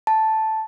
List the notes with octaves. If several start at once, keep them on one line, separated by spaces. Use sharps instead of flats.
A5